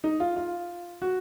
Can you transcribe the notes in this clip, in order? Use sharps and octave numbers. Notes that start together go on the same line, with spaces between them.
D#4
F4
F4
F#4